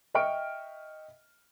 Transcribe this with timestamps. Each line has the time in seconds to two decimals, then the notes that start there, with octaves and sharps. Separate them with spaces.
0.14 D#5 E5 G5 C#6 F6 D7